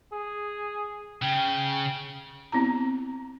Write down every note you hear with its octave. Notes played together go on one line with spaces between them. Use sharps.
G#4
C#3 G5
B3 C4 E4 A#5